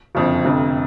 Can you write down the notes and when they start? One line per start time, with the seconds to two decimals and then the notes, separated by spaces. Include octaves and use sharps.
0.15 F#1 F2 D3 F3
0.44 F1 F2 D3